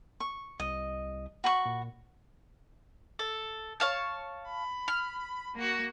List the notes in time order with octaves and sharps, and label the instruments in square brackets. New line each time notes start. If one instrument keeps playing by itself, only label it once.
[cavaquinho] C#6
[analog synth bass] C2 [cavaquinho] D#5
[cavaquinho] F#4 B5 C#6
[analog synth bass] A#2
[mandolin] A4
C#5 F5 A5
[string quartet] B5
[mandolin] F6
[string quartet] A#3 F#4